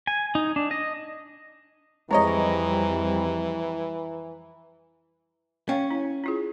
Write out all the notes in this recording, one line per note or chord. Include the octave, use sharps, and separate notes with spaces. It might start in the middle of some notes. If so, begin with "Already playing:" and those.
G#5
D#4
D4
D#5
F2 E3 G3 G#3 C4 C#5 D#5 A#5
C#4 C#5 F5 G5
E4
E4 F4 G#4